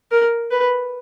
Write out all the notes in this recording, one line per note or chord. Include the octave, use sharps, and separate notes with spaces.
A#4
B4